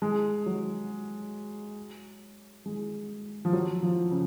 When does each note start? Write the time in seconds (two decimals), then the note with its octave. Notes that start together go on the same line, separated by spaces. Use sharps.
0.02 G#3
0.46 F#3
2.66 G#3
3.45 F3
3.53 F#3
3.83 F3
4.11 C#3